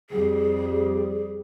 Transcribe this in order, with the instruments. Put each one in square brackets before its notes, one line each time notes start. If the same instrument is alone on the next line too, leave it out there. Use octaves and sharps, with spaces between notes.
[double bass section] F2 G3 [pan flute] G#4